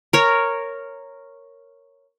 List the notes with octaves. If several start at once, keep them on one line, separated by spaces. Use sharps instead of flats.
A#4 C#5